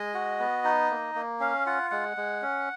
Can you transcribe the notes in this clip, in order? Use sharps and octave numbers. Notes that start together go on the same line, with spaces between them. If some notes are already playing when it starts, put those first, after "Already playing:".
Already playing: G#3 D#5
F#4
B3
D#4
A#3
A#3
C#4 F5
F4 F#5
G#3 F#5
G#3
C#4